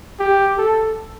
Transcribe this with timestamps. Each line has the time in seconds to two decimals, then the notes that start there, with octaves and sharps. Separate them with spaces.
0.20 G4
0.58 A4